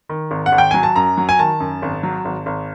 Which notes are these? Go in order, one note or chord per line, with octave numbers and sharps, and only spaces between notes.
D#3
G#1
F#5
G#1
G5
F#3 G#5
A5
F#2 A#5
F#3
G#5
D#3 A5
F#2
G#1
F#3
G#1
G#1